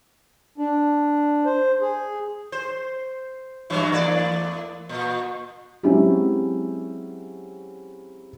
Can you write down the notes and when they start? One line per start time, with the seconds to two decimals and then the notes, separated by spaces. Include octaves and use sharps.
0.58 D4
1.45 C5
1.81 G#4
2.52 C5
3.70 G2 E3 F#3
3.92 E2 A3 D5
4.89 A#2
5.83 F#3 G#3 C4 C#4 E4 G4